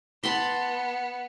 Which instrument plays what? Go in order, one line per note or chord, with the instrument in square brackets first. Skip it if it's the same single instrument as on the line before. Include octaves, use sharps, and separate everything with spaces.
[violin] B3 [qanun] A5 B5 C6